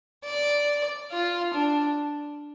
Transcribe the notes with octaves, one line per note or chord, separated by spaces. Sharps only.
D5
F4
D4